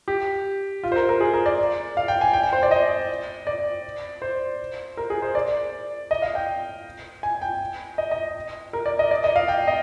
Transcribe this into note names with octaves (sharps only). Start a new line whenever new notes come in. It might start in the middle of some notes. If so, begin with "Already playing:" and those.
G4
F4
C5
A#4
A#4
G#4
A#4
D5
F5
G5
G#5
G5
G5
C5
D5
D#5
D5
C5
A#4
G#4
C5
D5
D#5
F5
G5
G#5
G5
D#5
D#5
A#4
D5
D#5
D5
D#5
F5
G5
D#5